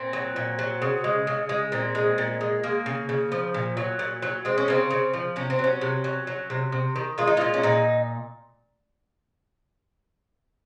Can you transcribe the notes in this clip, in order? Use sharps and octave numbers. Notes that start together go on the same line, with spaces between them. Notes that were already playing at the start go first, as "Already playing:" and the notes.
Already playing: A#2 C4
F#3
A#2
F#3
C#3
G#3
C#3
G#3
A#2 C4
G#3
A#2
G#3
G#3 A#3
C#3
C#3
F3
A#2
F#3
A#2
F#3
G#3 C4
C#4
C#3 C4
C#3
F3
C3 C#4
C4
F#3 C#4
C3
F#3
F#3
C3
C3
D#3
G#3 F4
D#4
A#2 F4
C#4
A#2 D#4